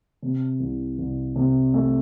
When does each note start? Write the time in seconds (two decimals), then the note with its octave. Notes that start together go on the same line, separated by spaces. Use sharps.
0.22 C3
0.60 C2
0.99 C2
1.36 C3
1.74 A3